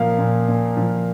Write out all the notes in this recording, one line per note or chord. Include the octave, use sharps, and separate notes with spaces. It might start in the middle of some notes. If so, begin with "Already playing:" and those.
Already playing: A#2 F3 A#3 F5
A#2
A#2
F3